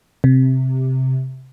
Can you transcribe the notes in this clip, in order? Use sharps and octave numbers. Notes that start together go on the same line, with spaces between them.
C3